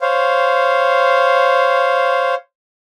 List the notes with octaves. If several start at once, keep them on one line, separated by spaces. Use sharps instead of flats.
C5 C#5 F5